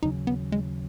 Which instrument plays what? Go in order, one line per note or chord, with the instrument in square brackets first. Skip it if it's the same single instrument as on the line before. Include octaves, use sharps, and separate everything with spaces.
[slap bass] D#2 C#3 F#3 [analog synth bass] D#4
[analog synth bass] B3
G#3